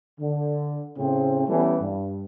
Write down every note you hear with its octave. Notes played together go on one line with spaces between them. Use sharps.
D3
A2 C#3 C4
E3 G3 A3 B3 C#4
G2